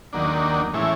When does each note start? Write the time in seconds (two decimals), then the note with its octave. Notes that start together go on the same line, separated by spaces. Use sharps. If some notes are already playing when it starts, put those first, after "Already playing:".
0.13 D#2 D#3 F#3 A#3 D4
0.73 A2 E3 G#3 C#4 E4